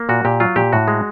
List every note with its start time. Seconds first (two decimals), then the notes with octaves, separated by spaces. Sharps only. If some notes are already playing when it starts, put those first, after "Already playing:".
Already playing: A#3
0.09 A#2 F#4
0.25 A#2 G4
0.40 F#3 F4
0.56 A#2 G4
0.73 A2 F#4
0.88 G#3